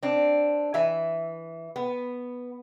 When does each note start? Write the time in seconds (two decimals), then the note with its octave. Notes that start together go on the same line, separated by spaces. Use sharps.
0.03 C4 D4
0.74 E3 E5 G#5
1.76 B3